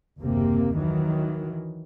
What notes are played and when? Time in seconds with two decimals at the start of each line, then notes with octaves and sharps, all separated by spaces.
0.19 F#1 D#2 C3 A#3 C4
0.76 D#3 E3 F#3